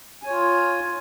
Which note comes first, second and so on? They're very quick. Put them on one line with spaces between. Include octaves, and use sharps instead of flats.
G#5 C#5 F4